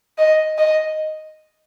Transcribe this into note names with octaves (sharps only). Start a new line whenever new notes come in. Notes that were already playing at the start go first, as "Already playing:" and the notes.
D#5
D#5